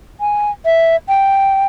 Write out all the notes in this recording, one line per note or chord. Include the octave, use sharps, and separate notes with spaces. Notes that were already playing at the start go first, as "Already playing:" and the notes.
G#5
E5
G5